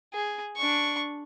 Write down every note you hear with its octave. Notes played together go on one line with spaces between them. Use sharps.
G#4
D4 C#6